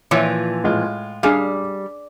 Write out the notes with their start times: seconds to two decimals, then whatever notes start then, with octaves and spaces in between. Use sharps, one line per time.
0.11 A#2 E3 F3 C#5 E5
0.64 A2 G#3 F4
1.23 G3 D4 G#4 F5